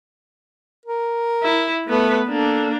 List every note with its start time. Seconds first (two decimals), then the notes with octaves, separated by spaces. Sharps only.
0.86 A#4
1.43 E4
1.88 A3 B3 B4
2.29 A#3 D4 A4